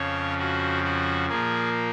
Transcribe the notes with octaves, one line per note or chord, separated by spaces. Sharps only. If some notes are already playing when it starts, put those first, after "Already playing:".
Already playing: F2 C#3 F3 C#5
F#4
F#4
A#2 F3 A#3 G#4